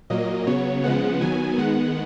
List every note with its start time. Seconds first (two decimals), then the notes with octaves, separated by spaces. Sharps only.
0.10 A#2 F#3 A#3 D#5
0.47 C#3 F#3 B3 C#5
0.84 C#3 F3 G#3 B3 F#5
1.21 D#3 F#3 B3 G#5
1.58 D#3 G#3 B3 F#5